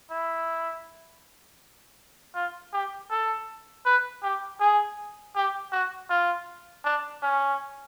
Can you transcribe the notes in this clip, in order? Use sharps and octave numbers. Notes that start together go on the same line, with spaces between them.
E4
F4
G4
A4
B4
G4
G#4
G4
F#4
F4
D4
C#4